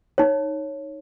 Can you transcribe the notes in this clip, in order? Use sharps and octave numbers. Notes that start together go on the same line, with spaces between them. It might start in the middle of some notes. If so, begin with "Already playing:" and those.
D#4 C#5